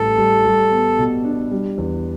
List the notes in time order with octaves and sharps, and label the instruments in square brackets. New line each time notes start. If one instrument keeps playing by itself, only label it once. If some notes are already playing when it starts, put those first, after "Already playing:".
Already playing: [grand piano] A1 A2 G3 [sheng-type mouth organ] A4
[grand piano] G3
G3
B3
B2
D4
G3
E2